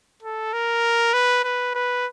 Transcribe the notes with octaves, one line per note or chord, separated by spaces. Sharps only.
A4
A#4
B4
B4
B4